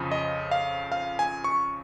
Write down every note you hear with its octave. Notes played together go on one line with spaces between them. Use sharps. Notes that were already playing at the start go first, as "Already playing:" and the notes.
Already playing: F2 C#3 F3
D#5
F5
F5
G#5
C#6